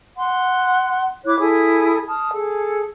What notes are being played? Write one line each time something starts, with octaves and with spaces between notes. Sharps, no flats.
F#5 C6
E4 C#5 D6 F#6
E4 G#4 A4 D#6
A5 D#6 F6
G#4 A4